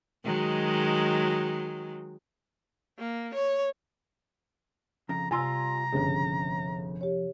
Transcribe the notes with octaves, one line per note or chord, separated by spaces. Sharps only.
D#3 F#3 G#3
A#3
C#5
F2 C#3 A#5
C3 G3 F4 G#5 A#5 C6 E6
G1 F2 G#2 C#3
G4 C#5